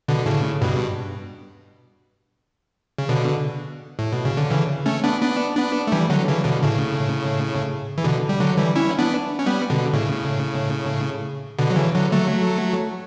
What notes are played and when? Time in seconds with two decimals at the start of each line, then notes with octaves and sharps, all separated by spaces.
0.08 B2 D3
0.19 D3
0.26 A2 C#3
0.61 G2 B2
2.98 C#3
3.09 B2 D3
3.99 A2
4.13 B2
4.25 C#3
4.37 D3
4.50 C#3 E3
4.86 A3 C#4
5.04 B3 D4
5.21 B3 D4
5.57 B3 D4
5.87 A3
5.92 E3 G3
6.10 D3 F#3
6.28 C#3 E3
6.45 B2 D3
6.63 A2 C#3
7.98 E3
8.04 B2 D3
8.29 G3
8.40 D3 F#3
8.58 E3 G3
8.75 C#4 E4
8.99 B3 D4
9.39 C#4
9.46 G3 B3
9.70 B2 D3
9.93 A2 C#3
11.59 B2 D3
11.70 F#3
11.76 C#3 E3
11.94 D3 F#3
12.12 F#3 A3